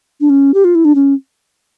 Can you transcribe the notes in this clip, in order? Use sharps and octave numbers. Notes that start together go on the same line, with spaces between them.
D4
C#4
G4
F4
E4
D4
C#4